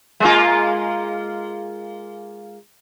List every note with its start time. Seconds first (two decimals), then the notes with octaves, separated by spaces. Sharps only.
0.20 G#3 A#3 F4